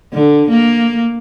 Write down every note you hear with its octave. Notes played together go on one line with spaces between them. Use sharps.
D3
A#3